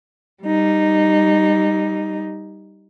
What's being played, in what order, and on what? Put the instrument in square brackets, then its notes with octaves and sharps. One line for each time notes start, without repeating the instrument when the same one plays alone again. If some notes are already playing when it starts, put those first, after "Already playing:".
[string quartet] G3 D#4